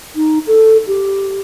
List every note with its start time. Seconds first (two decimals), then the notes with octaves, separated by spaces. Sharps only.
0.16 D#4
0.47 A4
0.87 G4